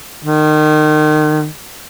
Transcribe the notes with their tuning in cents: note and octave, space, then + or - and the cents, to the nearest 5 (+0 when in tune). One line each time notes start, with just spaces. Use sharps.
D#3 -30